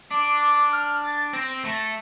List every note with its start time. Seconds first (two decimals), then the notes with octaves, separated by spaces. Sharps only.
0.10 D4 D6
0.41 D6
0.73 F6
1.03 A6
1.33 C4 A#6
1.64 A3